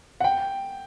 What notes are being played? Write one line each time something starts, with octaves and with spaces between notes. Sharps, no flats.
F#5
G5